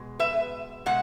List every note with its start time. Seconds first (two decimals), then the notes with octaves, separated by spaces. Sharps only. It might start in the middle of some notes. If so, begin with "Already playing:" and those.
Already playing: B2 G#3
0.19 B4 E5
0.86 B2 G#3 F#5